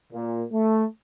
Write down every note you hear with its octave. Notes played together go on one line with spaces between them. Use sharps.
A#2
A3